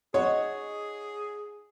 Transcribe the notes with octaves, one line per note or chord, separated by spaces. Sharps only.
D#4 F#4 G#4 C#5 D#5